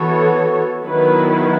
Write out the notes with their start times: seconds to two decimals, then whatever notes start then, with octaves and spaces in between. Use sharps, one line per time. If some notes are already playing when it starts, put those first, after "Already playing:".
Already playing: E3 B3 F#4 A4 C#5
0.83 D#3 F#3 B3 E4 B4